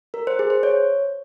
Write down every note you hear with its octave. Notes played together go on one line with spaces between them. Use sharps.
A#4
C5
G#4
C5
C#5